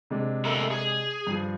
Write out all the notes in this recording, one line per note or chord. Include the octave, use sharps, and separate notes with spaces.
C3 G#3 D4
A4 A#4 E5
G#4
G2 F3